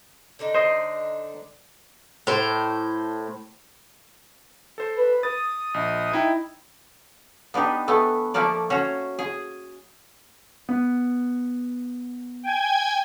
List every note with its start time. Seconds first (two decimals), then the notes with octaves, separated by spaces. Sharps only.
0.39 D3 D4 D#4
0.54 C5 D#5
2.27 A2 C5
4.78 A4 C5
4.96 B4
5.23 D#6 A6
5.74 A#1 D#5
6.12 D#4 E4 G5
7.54 B3 D4 D#4 G4
7.88 E3 A3 B3
8.34 F3 A3 A#3 D5
8.70 C#4 F#4 C5 C#5
9.19 G#4
10.69 B3
12.43 G5 G#5 G#6